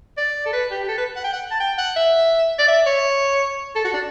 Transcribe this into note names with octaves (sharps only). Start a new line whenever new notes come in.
D5
A4
B4
G4
G4
A4
B4
F#5
G5
F#5
A5
G5
F#5
E5
D5
E5
C#5
A4
F#4
D4